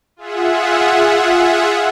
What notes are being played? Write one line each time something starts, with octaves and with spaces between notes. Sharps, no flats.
F4 G#4 E5 F#5